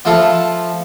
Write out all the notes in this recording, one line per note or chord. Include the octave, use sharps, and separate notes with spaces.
F3 E4 F4 A4